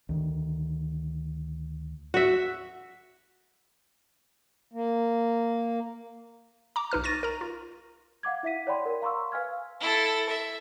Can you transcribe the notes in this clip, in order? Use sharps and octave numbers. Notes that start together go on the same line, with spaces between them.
D2 D#3
F#4 E5
A#3
A#5 D6
B1 D#4 B4 F6
C#6 A6 A#6 D#7
A#4 A#5
F4
F5 F#5 D6 G#6
E4 E5 F#5 B6 D#7
C#5 D5 F#5 G5 B5 C6
A#4
F5 A#5 C6 C#6 E6
B4 F5 G#5 F6 G#6
E4 A4
E5